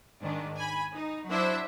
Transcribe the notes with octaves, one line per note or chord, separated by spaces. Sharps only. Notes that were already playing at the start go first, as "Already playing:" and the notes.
G#2 D#3 D4
G#5 B5
D#4
F#3 D4 E4 C5 E5